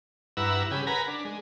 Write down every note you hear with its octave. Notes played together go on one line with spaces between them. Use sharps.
G2 E4 B4 F#5 A#5 E6
C#3 G4 G#4 B5
A#4 B4 F#5 G#5 A#5 B5
D4
G#3